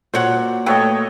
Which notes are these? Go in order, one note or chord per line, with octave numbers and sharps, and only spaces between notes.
A#2 F#4 C5 C#5 F#5
A3 A4 B4 C#5 D#5 F5 G5